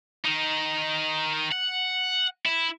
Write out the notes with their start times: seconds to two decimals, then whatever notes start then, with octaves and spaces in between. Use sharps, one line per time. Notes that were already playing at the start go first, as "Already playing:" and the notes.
0.25 D#3 D#4
1.52 F#5
2.46 E4